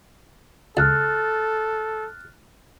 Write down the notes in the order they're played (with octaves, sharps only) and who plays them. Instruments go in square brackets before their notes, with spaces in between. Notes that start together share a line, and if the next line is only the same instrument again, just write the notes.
[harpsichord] C#2 [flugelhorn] A4 [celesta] F6 F#6 A6